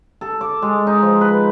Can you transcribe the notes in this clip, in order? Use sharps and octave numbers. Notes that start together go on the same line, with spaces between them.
A4
D6
G#3
D#4
F3
B4